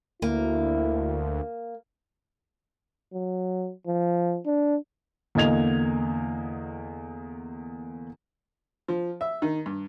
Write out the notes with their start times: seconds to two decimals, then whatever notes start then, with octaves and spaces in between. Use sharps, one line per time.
0.22 D2 A#3 E4
3.13 F#3
3.87 F3
4.46 D4
5.35 E2 D3 A#3 D#5 G#6 F7
8.88 F3
9.21 E5
9.42 D#3
9.66 G2